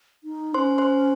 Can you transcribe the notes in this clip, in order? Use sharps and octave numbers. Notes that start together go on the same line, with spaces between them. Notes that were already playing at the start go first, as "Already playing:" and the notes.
D#4
C#4 C5 C6
C5 C6